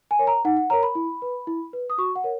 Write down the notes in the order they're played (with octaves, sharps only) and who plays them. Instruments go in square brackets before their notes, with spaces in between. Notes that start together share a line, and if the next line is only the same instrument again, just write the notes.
[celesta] G#5
A#4 C#5
A#5
D#4 F#5
F#5
A#4 C#5 A#5
B5
E4
B4
E4
B4
D#6
F#4 C#6
F#5
A#4 C#5